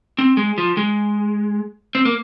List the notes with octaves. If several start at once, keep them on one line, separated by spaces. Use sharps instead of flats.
C4
G#3
F3
G#3
C4
A#3